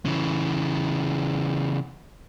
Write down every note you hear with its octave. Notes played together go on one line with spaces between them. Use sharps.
C#3 E3